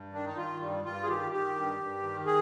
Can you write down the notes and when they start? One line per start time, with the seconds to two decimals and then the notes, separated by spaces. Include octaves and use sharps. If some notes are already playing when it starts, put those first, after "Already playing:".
Already playing: G2
0.13 D#3 D4
0.26 D#4
0.37 D#3 F4
0.60 G2 G3
0.84 G2 F4
1.03 G#4
1.08 D#3 G4
1.32 D#3 G4
1.55 G2
1.79 G2
2.03 D#3
2.26 G#4